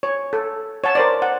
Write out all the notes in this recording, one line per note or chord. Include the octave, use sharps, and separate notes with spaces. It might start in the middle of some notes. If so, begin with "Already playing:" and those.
C#5
A4
C#5 F#5 A5
A#4 C5 D5
F#5